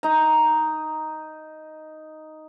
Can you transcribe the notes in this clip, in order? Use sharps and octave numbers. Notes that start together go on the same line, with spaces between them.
D#4 A#5